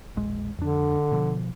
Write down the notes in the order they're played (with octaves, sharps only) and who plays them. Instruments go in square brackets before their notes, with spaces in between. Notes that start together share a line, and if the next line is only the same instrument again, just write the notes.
[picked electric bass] E1 A#1 G#3
[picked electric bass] F2 D4 [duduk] D3
[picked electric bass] B2 F3